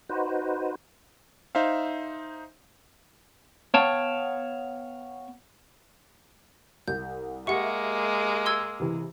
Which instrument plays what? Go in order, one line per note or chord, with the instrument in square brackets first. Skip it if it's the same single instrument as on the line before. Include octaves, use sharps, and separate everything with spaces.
[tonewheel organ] D#4 F#4 B4 C5
[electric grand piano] D#4 C5 E5 F5
[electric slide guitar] B3 C#5 F5 G5 A5
[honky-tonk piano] C2 [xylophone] G6
[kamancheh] G#3 A#3 [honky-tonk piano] G4 E5 C#7 [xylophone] F#5 C#6
[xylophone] C6 E6 G#6
[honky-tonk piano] C3 E3